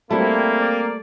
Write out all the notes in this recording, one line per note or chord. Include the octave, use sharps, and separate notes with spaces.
G3 A3 A#3 C4 E4
D5